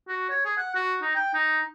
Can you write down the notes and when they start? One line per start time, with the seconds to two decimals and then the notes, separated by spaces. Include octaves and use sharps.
0.08 F#4
0.29 C#5
0.45 G#4
0.57 F#5
0.75 F#4
1.02 D#4
1.15 G5
1.34 D#4